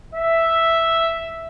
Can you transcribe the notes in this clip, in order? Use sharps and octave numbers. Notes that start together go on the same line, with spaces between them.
E5